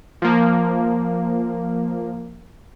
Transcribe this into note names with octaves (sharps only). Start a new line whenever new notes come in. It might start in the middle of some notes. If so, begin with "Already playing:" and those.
F3 A#3